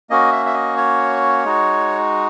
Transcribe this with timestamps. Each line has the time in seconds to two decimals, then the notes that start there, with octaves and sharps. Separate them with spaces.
0.10 A#3 C#4 F#4 D#5
0.32 E5
0.46 E5
0.54 D#5
0.77 C#5
1.44 G#3 D#4 F#4